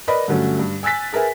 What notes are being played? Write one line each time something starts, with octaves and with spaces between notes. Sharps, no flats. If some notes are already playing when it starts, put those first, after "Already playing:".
A#4 B4 D5 D#5 B5
G2 D3 F#3 A3 C#4
G2
G#5 E6 F#6 A6 B6
G#4 A#4 B4 E5 G#5